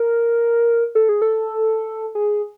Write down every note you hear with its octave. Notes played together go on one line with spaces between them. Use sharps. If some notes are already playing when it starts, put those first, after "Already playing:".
Already playing: A#4
A4
G#4
A4
G#4